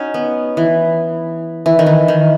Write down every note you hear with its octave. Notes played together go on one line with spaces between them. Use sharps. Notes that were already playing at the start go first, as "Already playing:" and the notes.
Already playing: C#4 D#4 F#4
B3
E3
E3
D#3
E3
D#3